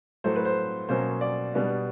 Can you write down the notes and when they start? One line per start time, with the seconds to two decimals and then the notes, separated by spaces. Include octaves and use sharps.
0.24 A2 F#3 A3 C5
0.36 B4
0.45 C5
0.89 B2 F#3 A#3 C#4 C5
1.21 D5
1.54 B2 G3 B3 D4